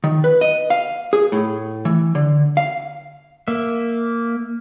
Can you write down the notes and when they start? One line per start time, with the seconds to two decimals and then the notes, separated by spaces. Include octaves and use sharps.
0.04 D#3
0.24 B4
0.41 D#5
0.70 F5
1.13 G#4
1.32 A2
1.85 E3
2.15 D3
2.57 F5
3.48 A#3 E5